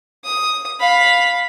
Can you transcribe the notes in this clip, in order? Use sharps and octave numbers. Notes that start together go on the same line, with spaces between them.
D#6
F5 B5